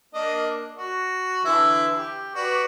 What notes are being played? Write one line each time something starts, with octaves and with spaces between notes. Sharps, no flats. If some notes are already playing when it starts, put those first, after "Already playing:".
A#3 D4 D#5
F#4
D3 E3 E4
G4
F#4 B4 D5